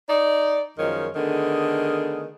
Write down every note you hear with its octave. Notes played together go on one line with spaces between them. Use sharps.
D#4 D5
F#2 D#3 F3 G#3 C#5
D3 D#3 A3 B3 G#4